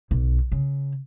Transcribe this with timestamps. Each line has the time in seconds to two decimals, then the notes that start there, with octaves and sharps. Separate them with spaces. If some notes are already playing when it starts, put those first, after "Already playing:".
0.11 B1
0.52 C#3